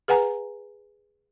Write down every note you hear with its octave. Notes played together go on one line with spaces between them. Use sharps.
G#4 B4 F#5 G#5 A#5